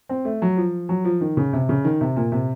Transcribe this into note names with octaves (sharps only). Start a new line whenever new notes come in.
C4
A3
F#3
F3
F#3
F3
D#3
C#3
C3
C#3
D#3
C3
A#2
C3